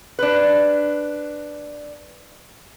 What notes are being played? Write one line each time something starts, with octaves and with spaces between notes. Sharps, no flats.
D4 B4